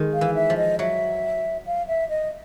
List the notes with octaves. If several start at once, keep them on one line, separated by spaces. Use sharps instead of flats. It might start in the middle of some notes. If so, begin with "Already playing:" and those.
Already playing: D#3 G#3
F5
E3
E5
F3
D#5
F#3 E5
F5
E5
D#5